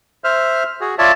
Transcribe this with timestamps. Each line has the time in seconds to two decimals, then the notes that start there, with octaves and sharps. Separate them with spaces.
0.24 C5 E5 F6
0.81 F#4 G#4
0.98 F4 C#5 D5 E5 A5